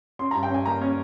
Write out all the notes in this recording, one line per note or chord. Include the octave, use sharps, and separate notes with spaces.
C#4 C6
G2 A#5
G5
C#4 G#5
A#3 A#5
C#4